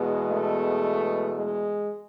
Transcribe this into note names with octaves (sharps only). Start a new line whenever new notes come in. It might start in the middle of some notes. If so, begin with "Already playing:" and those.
Already playing: E2 B2 G#3
A3
G#3